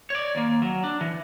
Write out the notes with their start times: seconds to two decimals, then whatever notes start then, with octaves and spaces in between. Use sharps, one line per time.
0.10 C#5 D5
0.35 D#2 A#3
0.62 F#3
0.84 D4
1.01 E3